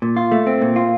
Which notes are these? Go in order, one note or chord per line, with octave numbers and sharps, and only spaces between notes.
A#2
F4
A3
C4
A#2
F4